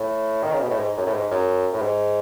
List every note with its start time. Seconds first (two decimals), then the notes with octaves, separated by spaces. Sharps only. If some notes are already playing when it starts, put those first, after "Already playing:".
Already playing: A2
0.43 D#3
0.53 C#3
0.61 B2
0.70 A2
0.79 G#2
0.97 F#2
1.07 A2
1.14 G#2
1.31 F#2
1.73 A2
1.82 G#2